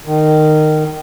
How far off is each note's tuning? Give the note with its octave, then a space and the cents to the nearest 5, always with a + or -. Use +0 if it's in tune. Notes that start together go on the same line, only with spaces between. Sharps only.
D#3 -15